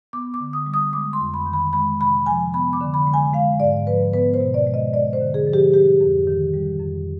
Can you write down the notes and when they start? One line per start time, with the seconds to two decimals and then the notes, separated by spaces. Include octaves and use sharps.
0.13 B3 D6
0.34 D6
0.40 D3
0.53 D#6
0.66 G3
0.74 D#6
0.93 G#3 D6
1.13 C6
1.21 F2
1.34 B5
1.46 D#3
1.53 B5
1.73 G#3 B5
2.00 C3 B5
2.26 F3 G#5
2.53 B3 B5
2.73 D6
2.81 D3
2.94 B5
3.07 G#3
3.14 G#5
3.34 G#3 F5
3.60 G#2 D5
3.87 F3 B4
4.13 B3 B4
4.34 C5
4.40 B2
4.54 D5
4.67 G#3
4.74 D#5
4.93 G#3 D5
5.13 C5
5.20 D3
5.34 G#4
5.47 F3
5.53 G4
5.74 G3 G4
6.01 F2
6.27 D#3
6.54 G3
6.80 F2